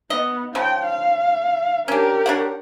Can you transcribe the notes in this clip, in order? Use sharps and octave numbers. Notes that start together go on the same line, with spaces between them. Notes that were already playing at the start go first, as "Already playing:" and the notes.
B3 D#5
C#3 F3 G5
F5
C#4 D4 G4 A#4
D4 C#5 F#5